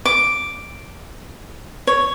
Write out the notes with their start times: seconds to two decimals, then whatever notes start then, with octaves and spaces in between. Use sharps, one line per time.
0.05 D6
1.87 C#5